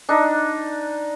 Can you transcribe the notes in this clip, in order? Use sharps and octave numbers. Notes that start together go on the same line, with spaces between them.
D4 D#4